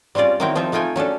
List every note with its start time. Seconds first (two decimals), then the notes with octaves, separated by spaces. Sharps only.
0.15 G3 C4 C#4 F4 D5
0.40 D#3 F#3 C4 E4 A#4 G5
0.55 F3 C4 D#4 F4 E5
0.72 A3 D#4 F4 G5 G#5
0.96 F#3 C#4 D4 A4